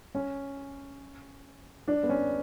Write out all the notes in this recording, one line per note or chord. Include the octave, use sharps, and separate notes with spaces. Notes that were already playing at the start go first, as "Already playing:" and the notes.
C#4
D4
B3
C#4